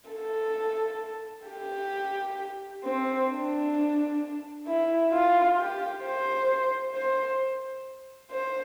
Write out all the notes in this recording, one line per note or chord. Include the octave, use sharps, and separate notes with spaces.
A4
G4
C4
D4
E4
F4
G4
C5
C5
C5